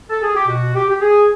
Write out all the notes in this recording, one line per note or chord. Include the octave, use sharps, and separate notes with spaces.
A4
G#4
G4
B2 F#4
G4
G4
G#4